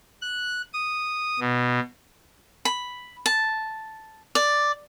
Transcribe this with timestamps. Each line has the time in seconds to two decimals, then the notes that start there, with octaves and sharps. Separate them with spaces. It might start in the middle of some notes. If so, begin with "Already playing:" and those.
0.22 F#6
0.73 D#6
1.40 B2
2.65 B5
3.26 A5
4.35 D5